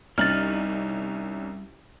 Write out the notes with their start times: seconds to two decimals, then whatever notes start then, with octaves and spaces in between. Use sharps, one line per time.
0.18 C2 G3 C#4 D#4 F6 A6 F#7